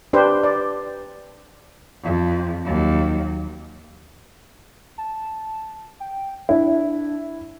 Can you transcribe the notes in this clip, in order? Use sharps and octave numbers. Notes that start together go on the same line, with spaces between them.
D4 G4 B4 C5
D5
F2
D#2 F#3
A5
G5
D4 E4